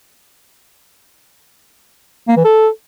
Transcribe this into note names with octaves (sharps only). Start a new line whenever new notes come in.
A#3
E3
A4